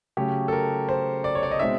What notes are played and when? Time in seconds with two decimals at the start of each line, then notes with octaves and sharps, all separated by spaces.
0.17 C#3 F#3 A3 C#4 G4
0.48 A4
0.53 A#4
0.89 C5
1.24 D5
1.35 C#5
1.43 D5
1.51 D#5
1.59 B2 G#3 C4 D#4 E5